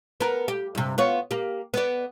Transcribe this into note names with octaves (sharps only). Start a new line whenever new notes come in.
B3 A#4
G4
G2 C3
B3 F4 C#5
A#3 G4
B3 D5